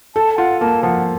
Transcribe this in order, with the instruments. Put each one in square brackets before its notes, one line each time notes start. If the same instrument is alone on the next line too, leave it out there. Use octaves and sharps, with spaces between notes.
[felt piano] A4 [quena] A5
[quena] A5
[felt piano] F4 [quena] F#5
[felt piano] A#3 [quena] A5
[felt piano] F3 [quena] F#5